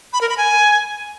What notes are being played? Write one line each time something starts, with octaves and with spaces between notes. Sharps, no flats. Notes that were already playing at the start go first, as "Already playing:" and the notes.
B5
A#4
B5
G#5